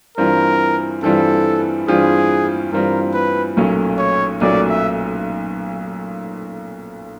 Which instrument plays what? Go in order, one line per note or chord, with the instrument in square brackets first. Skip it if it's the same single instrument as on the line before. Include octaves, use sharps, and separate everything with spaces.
[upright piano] G2 E3 G3 C4 F4 [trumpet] A#4
[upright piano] G2 E3 G3 C4 F4 [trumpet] A4
[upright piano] G2 E3 G3 C4 F4 [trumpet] G#4
[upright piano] G2 E3 G3 C4 F4 [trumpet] A#4
[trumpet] B4
[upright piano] B1 A#2 F#3 A3 C#4
[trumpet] C#5
[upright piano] B1 A#2 F#3 A3 C#4 [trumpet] D5
[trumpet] E5